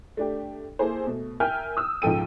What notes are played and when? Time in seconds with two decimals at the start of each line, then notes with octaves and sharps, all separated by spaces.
0.17 A3 D4 G4
0.79 A#3 E4 G#4 A4 C5
1.07 B2 A3
1.40 A#4 E5 G5 G#5 F6 G6
1.77 D#6 E6
2.02 C#2 G#2 F3 A4 G5 D#7